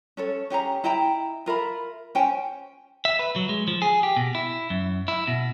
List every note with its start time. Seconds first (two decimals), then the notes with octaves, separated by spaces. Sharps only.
0.17 C#4 A4 C#5
0.50 C#4 G4 G#4 A#5
0.84 E4 D#5 G5 A#5
1.46 F4 A#4 E5 B5
2.15 C#4 C5 G5 G#5
3.05 E5
3.19 B4
3.36 F#3
3.49 G#3
3.68 F3
3.82 G#4
4.03 G4
4.17 B2
4.35 E4
4.70 F#2
5.08 E4
5.27 B2